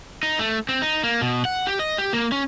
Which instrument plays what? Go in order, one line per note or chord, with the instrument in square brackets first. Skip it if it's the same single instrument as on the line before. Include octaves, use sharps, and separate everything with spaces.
[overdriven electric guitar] D#4
A3
C4
D#4
A#3
B2
F#5
G4
D#5
G4
A#3
C#4